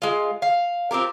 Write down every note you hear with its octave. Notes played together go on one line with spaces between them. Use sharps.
G#3 F4
F5
C4 F4 G4 A#4